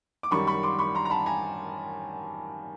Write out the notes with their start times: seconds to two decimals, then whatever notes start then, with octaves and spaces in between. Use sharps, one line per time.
0.23 D6
0.31 F#2 D#3 G3 B5 C#6
0.47 B5 C#6
0.63 C6 D6
0.79 B5 C#6
0.95 A#5 C6
1.05 A#5
1.10 A5 B5
1.26 G#5 A#5